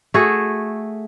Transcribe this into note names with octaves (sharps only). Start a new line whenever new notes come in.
A3 F#4 G#4